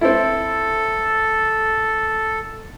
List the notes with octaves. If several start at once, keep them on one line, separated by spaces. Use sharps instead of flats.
C4 E4 A4